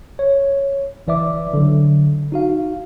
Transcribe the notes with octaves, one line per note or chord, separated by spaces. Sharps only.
C#5
G1 E3 D5 E5 D6
D3 F#3
D#4 F#4 F5